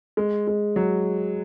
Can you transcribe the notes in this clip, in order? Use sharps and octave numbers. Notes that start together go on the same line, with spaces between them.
G#3
G#3
F#3